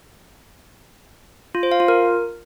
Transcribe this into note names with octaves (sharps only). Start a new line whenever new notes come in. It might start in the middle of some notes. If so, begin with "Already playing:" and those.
F4
C5
F5
F4
A#4